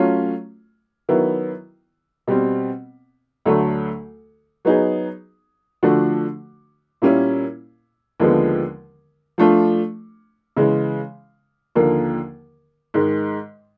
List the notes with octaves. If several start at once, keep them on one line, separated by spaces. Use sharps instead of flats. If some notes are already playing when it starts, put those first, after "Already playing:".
Already playing: F#3 A3 C#4 F4
D#3 F#3 B3 E4
B2 G3 C4
D2 D3 F#3 A3
F#3 B3 D#4 G#4
D3 F3 A3 D4 F#4
A#2 G3 A#3 C#4 E4
D#2 D3 F3 G#3 B3
F3 A3 D4 F4
C#3 E3 G#3
D#2 D3 F3 A#3
G#2 D#3 G#3